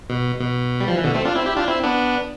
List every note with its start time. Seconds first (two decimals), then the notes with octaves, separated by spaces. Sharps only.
0.10 B2
0.41 B2
0.80 G3
0.88 F3
0.96 E3
1.04 B2 D3
1.14 A3 C4
1.25 D4 F4
1.35 C4 E4
1.46 E4 G4
1.57 D4 F4
1.68 C4 E4
1.84 B3 D4